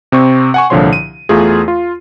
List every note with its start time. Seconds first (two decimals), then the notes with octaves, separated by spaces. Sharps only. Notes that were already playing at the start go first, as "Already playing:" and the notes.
0.12 C3 C4 C#6
0.54 F#5 G#5 C#6
0.70 C2 A#2 D3 F3 C#5 C6
0.93 D#7
1.29 E2 A3 F4 G#4
1.68 F4